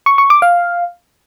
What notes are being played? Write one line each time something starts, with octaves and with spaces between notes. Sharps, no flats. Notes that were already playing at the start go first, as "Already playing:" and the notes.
C#6
C#6
D6
F5